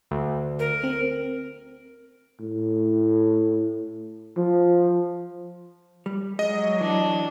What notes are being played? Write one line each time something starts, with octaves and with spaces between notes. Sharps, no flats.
D2
A#4
C4
A2
F3
G3
F#3 G#3 D#5
E3 D4